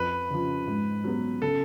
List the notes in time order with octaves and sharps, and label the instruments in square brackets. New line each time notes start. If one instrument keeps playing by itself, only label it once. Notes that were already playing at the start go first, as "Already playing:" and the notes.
Already playing: [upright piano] F2 [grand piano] B4
[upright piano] C#3 F3
G#2
F#3 B3
[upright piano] C#3 [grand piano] A4